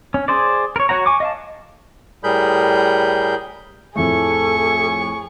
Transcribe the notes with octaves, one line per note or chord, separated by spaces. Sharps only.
C#4
G#4 C5 D5
A#4 C#5
F#4 C#5 F#5 A#5
G#5 C#6 D6
D#5 F5 A5
A2 G3 G#4 A#4 B5 G6
F2 A2 A3 G#4 A4 C#6